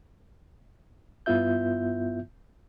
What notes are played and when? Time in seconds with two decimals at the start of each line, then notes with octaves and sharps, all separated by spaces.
1.26 G2 B3 E4 F4 E5 G6